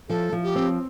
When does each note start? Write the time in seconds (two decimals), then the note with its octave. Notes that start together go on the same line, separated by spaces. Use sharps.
0.09 F3 A4
0.32 F3
0.44 G4
0.55 C4